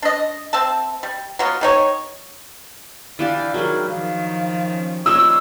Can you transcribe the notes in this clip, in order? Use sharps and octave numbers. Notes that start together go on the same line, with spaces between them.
D4 D#5
C4 E5 A5
G3
F#3 B3 F4
D#3 D#4 C#5
D3 E3 D4 G4 D5 F5
D#3 F#3 G3 G#4 A#4
D#3 F3 F5
C#4
F3 G3 A#3 C#5 D#5 E6